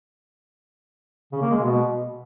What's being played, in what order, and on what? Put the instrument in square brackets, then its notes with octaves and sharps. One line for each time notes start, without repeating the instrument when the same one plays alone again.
[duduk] C#3
A#3
G#3
B2